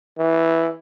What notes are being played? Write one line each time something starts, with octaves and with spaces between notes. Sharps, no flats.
E3